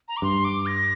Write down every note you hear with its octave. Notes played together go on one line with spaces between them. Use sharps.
A#5
D6
G2 C6
D6
A#6